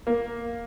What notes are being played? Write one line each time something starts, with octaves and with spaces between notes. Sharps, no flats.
A#3